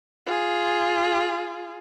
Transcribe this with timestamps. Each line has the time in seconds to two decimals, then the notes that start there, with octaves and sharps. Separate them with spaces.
0.27 F4 G#4